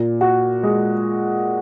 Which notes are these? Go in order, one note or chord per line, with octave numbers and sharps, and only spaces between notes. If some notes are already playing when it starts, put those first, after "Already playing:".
Already playing: A#2
F#4
G#3